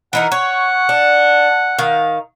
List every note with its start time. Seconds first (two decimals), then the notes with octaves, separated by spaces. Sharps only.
0.13 E3 D#4 A#4 F#5
0.32 C#5 F#5
0.89 D4
1.79 D#3 F5